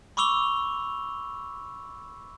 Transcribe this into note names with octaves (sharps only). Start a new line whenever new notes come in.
B5 C#6 D6 E6 F7 G7